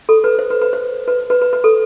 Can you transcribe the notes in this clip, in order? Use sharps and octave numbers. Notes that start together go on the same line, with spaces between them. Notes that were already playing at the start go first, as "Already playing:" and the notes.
A4
B4
C5
B4
B4
C5
B4
B4
B4
B4
A4